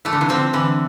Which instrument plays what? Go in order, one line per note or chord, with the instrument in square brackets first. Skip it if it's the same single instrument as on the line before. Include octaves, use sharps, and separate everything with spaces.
[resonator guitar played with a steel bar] E3 [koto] A3
[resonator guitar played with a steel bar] D3
C3 E3
[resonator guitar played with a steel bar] D3 F3 [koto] C4
[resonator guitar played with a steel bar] D3 [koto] E3